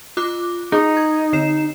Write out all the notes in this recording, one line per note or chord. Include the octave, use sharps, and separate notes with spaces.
F4 D6 F#6
D#4 G#4
G#6
D3 C7 E7